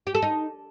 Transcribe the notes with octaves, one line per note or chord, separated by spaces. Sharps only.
G4
A4
D#4